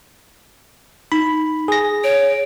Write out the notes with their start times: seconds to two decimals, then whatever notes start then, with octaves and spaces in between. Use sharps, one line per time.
1.12 D#4 B5
1.68 G#4 A#6
2.04 C#5 D7